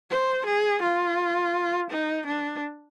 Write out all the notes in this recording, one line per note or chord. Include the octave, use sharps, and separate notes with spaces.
C5
G#4
F4
D#4
D4